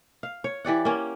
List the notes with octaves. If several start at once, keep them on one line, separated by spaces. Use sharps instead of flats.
F5
C#5
E3 G4 D5 F#5
A#3 C#4